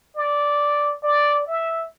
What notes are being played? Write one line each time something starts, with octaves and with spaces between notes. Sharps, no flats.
D5
D5
E5